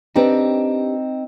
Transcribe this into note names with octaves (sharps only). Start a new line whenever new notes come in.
C4 D4 D#4 G4 B4